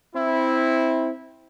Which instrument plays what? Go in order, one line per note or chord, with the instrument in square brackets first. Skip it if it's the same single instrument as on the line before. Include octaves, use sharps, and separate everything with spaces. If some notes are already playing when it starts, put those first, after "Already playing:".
[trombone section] C4 E4